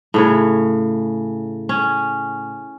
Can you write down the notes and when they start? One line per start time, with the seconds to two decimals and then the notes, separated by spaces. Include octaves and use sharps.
0.14 A2 C#3 C#5
1.69 C#4